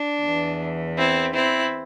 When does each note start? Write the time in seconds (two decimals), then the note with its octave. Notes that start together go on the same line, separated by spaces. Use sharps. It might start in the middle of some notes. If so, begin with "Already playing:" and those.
Already playing: D4
0.23 E2 E3
0.98 C4 E4
1.35 C4 E4